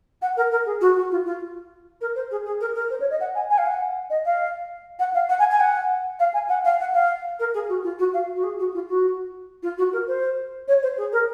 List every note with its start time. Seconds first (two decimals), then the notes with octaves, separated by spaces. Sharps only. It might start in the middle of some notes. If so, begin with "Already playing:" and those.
0.21 F#5
0.36 A#4
0.51 A#4
0.65 G#4
0.80 F#4
0.96 F#4
1.11 F4
1.25 F4
2.00 A#4
2.15 C5
2.31 G#4
2.45 G#4
2.60 A#4
2.75 A#4
2.90 C5
3.00 C#5
3.10 D#5
3.20 F#5
3.34 G#5
3.50 G#5
3.57 F5
3.65 F#5
4.10 D#5
4.25 F5
4.99 F#5
5.14 F5
5.29 F#5
5.39 G#5
5.50 G#5
5.60 F#5
6.19 F5
6.33 G#5
6.48 F#5
6.64 F5
6.79 F#5
6.94 F5
7.39 A#4
7.54 G#4
7.68 F#4
7.83 F4
7.98 F#4
8.13 F5
8.35 F#4
8.43 G#4
8.59 F#4
8.73 F4
8.88 F#4
9.62 F4
9.77 F#4
9.92 A#4
10.07 C5
10.67 C#5
10.82 C5
10.97 G#4
11.12 A#4